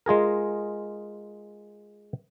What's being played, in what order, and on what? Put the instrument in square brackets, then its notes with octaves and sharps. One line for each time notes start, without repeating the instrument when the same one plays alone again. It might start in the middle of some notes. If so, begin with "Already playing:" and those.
[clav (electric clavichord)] G#3 F4 G#4 A#4